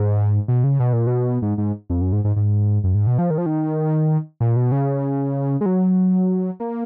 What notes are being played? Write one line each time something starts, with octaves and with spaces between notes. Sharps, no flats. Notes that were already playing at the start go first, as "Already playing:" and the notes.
Already playing: G#2
B2
C#3
B2
A#2
B2
G#2
G#2
F2
F#2
G#2
G#2
G#2
F#2
G#2
B2
F3
D#3
F3
D#3
A#2
B2
C#3
G#3
F#3
A#3